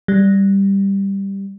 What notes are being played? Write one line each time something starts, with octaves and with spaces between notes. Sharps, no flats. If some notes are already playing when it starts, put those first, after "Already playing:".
G3